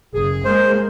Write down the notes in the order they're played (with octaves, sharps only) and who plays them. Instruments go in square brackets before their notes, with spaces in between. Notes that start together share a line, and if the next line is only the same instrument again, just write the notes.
[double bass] F#1 [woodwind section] G#4
[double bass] G#3 A#3 [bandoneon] C5